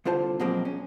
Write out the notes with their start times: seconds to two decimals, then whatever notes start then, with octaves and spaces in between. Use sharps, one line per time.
0.05 C2 D3 F4 C5 A5
0.40 B2 F3 F#3 G#3 A#3 C4
0.65 C#4